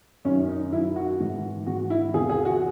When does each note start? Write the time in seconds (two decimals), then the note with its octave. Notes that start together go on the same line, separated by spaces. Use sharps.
0.25 F#2 C#4
0.28 D#3
0.49 D#4
0.72 F#2 D#3 E4
0.96 F#4
1.20 G#2 E3
1.67 G#2 E3 F#4
1.90 E4
2.14 E2 C3 E3 G#4
2.29 G#4
2.45 F#4